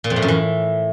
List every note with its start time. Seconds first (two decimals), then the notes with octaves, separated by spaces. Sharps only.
0.04 A#2
0.10 F2
0.16 A2
0.22 F#2
0.28 E3